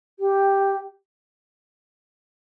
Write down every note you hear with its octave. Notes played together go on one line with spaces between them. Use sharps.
G4